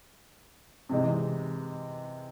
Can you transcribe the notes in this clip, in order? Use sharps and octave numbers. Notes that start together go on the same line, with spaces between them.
C3 E3 G#3 D#4